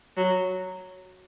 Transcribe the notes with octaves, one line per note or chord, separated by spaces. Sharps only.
F#3